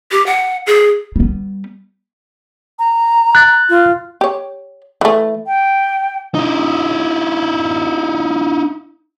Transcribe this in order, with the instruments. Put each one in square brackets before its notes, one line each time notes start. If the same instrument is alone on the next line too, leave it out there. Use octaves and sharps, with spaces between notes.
[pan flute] G4
F#5
G#4
[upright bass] G3 B3
[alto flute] A#5
[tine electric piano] F#6 A6
[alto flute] F4
[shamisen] G4 C#5
E3 A3
[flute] G5
[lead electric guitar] D#4 E4